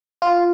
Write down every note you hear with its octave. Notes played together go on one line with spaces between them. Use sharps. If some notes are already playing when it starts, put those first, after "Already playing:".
F4